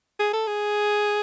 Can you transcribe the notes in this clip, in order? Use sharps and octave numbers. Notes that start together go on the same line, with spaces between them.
G#4
A4
G#4